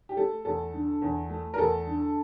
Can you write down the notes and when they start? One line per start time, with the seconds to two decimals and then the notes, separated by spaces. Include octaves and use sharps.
0.09 G4
0.17 A3 A4
0.45 E2 A4
0.73 D3
1.02 E2
1.30 A3
1.54 A#4
1.58 E2 A4
1.87 D3